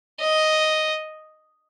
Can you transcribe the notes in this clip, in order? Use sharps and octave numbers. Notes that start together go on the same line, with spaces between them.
D#5